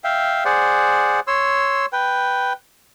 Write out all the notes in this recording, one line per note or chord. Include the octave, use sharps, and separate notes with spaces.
E5 F5 G5
G#4 C5 D5 F#5
C#5 C6 E6
B4 G5